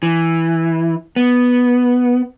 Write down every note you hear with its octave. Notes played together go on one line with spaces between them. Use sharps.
E3
B3